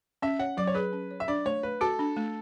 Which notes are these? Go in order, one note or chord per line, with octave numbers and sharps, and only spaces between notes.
C#4 E5
C#5 F#5
F#3 D5
C#5
G#4 B4
C#4
C#5
E5
D4 D5
A3 C#5
A3 B4
F#4 A4
D4
A3